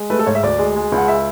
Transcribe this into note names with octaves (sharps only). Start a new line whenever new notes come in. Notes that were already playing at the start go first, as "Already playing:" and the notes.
Already playing: G#3
A3 B4
A4
G#2 C#5
E5
D2 D5
G#3
G#3
C#2
F#5
E5